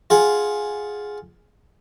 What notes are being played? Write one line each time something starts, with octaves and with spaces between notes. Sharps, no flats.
F4 G#4 F#5